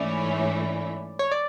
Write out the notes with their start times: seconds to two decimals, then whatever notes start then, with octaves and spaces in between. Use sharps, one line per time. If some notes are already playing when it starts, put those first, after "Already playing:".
Already playing: G#2 E3 A3 C#4 E4 D5
1.19 C#5
1.32 D5